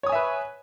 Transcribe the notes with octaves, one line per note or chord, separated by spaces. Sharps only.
B4 C#5 E5 G#5 D#6